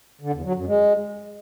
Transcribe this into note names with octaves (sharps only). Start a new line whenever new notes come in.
D3
E2
F#3
F#2
G#3